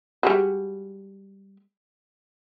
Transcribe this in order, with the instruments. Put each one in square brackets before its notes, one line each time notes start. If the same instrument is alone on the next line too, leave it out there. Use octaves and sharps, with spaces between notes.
[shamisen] G3 G#3 F#4